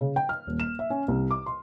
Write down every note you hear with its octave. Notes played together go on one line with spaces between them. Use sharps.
C#3
G5
F6
D#1
E7
E5
C#4
C2
D6
C6